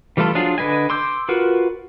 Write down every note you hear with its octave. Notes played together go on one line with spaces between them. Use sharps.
E3 G3 A3 F4 A4
F3 F#3 D4 F4 G#4
D3 B4 D#5 G#5
C6 D6 E6 G6
F4 F#4 A#4 B4